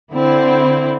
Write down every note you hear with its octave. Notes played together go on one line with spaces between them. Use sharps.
D3 C4 E4